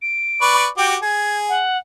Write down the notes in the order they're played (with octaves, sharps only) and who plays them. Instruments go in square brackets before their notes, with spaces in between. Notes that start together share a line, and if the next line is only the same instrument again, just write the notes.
[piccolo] D7
[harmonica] B4 D5 C#6
[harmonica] F#4 G4 D6 [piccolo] G5
[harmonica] G#4 [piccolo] G#6
[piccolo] F#5